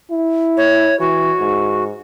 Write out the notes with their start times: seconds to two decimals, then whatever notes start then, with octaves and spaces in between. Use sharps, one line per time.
0.11 E4
0.57 C#5
1.00 E3 F#4
1.39 G#2